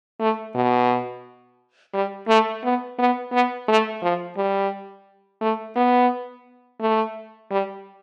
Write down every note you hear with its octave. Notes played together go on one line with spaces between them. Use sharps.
A3
B2
G3
A3
B3
B3
B3
A3
F3
G3
A3
B3
A3
G3